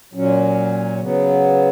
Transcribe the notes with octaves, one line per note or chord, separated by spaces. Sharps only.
A#2 F#3 C#4
C#3 F#3 B3